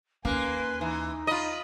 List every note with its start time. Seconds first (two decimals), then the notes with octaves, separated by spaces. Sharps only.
0.25 D#2 A#3 C#4 B4 G#5 C6
0.81 E3 D#4
1.27 F4 D#5 B5